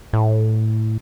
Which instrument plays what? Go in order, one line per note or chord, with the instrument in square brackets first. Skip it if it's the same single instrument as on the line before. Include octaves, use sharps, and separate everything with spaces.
[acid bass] A2